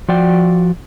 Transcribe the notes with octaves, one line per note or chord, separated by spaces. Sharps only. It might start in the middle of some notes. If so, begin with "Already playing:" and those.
F3 F#4 D5 G5